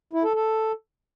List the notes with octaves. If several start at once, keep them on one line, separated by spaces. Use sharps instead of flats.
E4
A4
A4